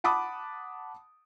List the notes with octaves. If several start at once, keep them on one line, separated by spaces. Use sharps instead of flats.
F#5 A5 B5 D6 D#6